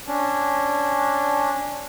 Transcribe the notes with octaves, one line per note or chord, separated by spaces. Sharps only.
C#4 D4